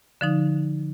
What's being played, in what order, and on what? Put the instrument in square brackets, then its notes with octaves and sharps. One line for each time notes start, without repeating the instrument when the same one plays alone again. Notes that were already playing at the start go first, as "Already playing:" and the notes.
[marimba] D3 F3 D#4